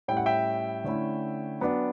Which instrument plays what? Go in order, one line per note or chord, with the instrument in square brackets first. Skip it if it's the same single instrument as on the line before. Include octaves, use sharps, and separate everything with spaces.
[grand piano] A2 G3 C#4 E4 G5
F#5
E5 G5
D3 A3 C#4 E4
F#3 B3 D4